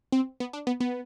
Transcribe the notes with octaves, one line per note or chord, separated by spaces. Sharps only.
C4
B3
D4
B3
B3